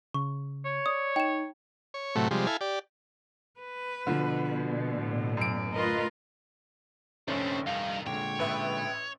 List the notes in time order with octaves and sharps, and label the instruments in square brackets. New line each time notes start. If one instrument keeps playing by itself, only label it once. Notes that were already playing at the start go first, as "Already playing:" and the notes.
[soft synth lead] C#3 [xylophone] C#6
[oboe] C#5
[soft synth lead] D5 [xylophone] D#6
[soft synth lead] D#4 [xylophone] G5 E7
[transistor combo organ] C#5
A2 C3 F#3 A3
C3 F3 G3 G#3
E4 A4 F5 G#5
G4 D5
[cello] B4
[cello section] B2 [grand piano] D3 F3
[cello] A2
[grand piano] F#2 D7
[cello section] D2 F4 D#5 [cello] A#4 B4
[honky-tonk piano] F1 A#1 [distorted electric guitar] D#3 G3 [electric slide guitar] C#4 D4 C#5 [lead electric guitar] C5
[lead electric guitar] G2 [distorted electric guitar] D#4 A#4 [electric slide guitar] F5
[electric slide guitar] A#2 D3 G#3 [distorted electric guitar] C#5 [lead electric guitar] G5
[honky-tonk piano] A1 B4 E5